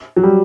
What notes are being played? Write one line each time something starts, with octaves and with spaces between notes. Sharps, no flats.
F#3
G3